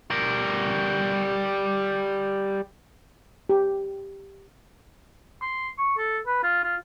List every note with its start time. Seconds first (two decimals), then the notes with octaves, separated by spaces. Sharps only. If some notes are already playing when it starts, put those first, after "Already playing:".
0.11 G3 A#4
3.49 G4
5.42 C6
5.78 C#6
5.98 A4
6.27 B4
6.43 F4
6.64 F4